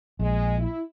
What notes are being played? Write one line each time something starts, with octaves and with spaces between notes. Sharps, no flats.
A#1 G#3
E4